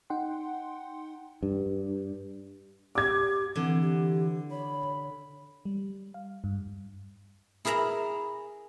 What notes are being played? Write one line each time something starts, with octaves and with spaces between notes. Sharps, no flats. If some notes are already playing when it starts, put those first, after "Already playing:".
D#4 F#5 G5 C6
G2
G4 D6 G#6
D3 E3 C4
G4
C#5 B5
G3
F5
G2
E4 G#4 A#4 E5 A#5 B5